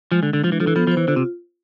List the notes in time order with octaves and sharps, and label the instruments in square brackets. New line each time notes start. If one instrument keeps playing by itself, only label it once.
[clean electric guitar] F3 [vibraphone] G#3
[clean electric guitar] D3
[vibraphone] G#3
[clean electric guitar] D3
[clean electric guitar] F3 [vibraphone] D4
[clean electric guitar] E3
[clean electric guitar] F3 [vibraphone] A4
[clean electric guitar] E3
[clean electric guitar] F3 [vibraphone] B3
[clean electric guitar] F3
[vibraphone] C5
[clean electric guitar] E3
[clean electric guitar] D3 [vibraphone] F4
[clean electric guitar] C3